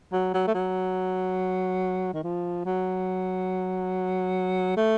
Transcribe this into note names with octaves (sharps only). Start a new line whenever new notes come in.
F#3
F#3
A3
F#3
D#3
F3
F#3
A3